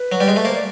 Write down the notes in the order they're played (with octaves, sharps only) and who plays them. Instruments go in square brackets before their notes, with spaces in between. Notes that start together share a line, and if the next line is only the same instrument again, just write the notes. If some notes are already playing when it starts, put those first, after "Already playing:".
Already playing: [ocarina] B4
[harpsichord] F#3
G3
G#3
A3
[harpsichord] A#3 [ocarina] C5
[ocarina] D5